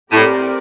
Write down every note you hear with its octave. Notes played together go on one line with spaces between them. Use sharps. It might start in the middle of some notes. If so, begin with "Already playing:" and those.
A2 C4 G4 A#4 D5